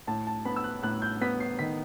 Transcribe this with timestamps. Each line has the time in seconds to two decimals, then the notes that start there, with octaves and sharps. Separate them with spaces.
0.07 A2 A5
0.27 A5
0.45 B3 B5
0.56 E6
0.64 F#6
0.83 A2 F#6
1.02 G6
1.21 B3 B6
1.40 C7
1.59 D#3 B6